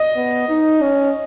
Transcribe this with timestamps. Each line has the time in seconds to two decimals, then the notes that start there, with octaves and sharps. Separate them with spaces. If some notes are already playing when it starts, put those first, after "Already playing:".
Already playing: D#5
0.16 B3
0.49 D#4
0.82 C#4